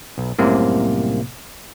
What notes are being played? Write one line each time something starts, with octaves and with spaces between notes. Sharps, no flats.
B1
C2 F#2 A2 C3 A#3 C5